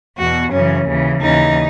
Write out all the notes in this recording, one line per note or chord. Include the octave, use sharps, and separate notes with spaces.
E2 B2 F#4
F#2 C#3 E3 C#4
D#2 C#3 E3
D#2 C#3 E3 D#4